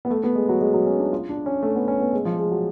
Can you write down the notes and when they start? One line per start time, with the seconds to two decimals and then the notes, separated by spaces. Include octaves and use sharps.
0.05 B3
0.10 A3
0.24 B3
0.35 G#3
0.49 F#3
0.61 G#3
0.74 F#3
0.86 C#4
1.00 D4
1.12 F4
1.29 D4
1.46 C#4
1.63 A3
1.75 B3
1.88 C#4
2.00 B3
2.13 G#3
2.25 F3
2.39 G#3
2.51 F#3